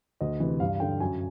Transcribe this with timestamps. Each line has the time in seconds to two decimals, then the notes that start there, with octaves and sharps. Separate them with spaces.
0.21 D2 D#5
0.40 C3 E3
0.60 G2 F5
0.80 D3 G5
1.00 F#2 G#5